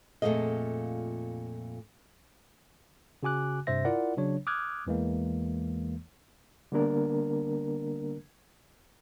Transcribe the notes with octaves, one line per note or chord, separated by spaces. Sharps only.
F2 A#2 A3 F4 G#4 D#5
C#3 F#4 G#5 D6 F#6
G2 C3 C5 E5 A#6
E4 F4 A#4 D5 F#5
C#3 F#3 D4 C#5
D6 D#6 F6 F#6 G#6
E2 E3 G#3 A#3
D3 G3 A#3 B3 D4 A#4